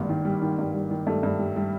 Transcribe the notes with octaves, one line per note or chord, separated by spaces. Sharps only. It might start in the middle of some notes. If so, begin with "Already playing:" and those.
Already playing: G#1 G2 A#3
D#3
G3
D#3
G2
G3
D#3
G2 A3
G2
G3
G3